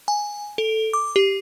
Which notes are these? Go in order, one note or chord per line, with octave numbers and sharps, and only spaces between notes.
G#5
A4
D6
G4